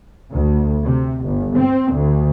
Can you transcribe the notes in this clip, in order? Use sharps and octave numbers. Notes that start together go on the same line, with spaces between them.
D2
C3
G1
C4
D2